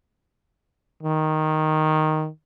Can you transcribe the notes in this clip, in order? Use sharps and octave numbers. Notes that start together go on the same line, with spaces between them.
D#3